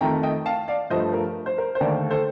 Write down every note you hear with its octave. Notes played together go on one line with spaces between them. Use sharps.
F2 D#3 A3 G5 A#5
D#5 G5
F5 A5
D5 F5
G2 F3 A3 C5 D#5
A#4
C5
A#4
C5
D#2 D3 A3 A#4 D5
A4 C5